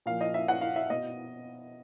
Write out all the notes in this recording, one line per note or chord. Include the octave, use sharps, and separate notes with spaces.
A#2 F3 F5
D#5
E5
F#5
F5
E5
B2 D#5